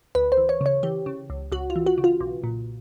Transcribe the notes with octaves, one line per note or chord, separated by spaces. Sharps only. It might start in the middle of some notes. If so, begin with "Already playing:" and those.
D2 B4
C5
E3
C#5
C#3 C#5
E3 G4
C#3
C#2
C#2 F#4
F4
E3
F#4
C#3
F4
B1
A#2